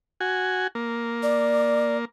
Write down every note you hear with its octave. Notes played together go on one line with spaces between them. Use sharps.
F#4 G#5
A#3
D5